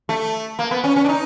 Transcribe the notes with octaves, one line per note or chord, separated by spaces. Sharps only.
A3
A#3
B3
C#4
C#4
D4
D#4